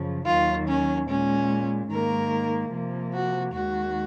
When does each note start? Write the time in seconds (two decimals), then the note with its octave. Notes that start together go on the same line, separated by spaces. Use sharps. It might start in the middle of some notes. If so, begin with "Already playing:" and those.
Already playing: F#2 C#3 F3
0.26 D#2 D#3 F#3 F4
0.67 C#4
1.08 A#2 G#3 C#4
1.90 G#2 D#3 A#3 A#4
2.72 C3 F3 A#3
3.13 F#4
3.54 D#2 D#3 G#3 F#4